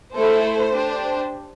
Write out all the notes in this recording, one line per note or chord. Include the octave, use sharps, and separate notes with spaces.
A3 E4 A4 C5
D4 G4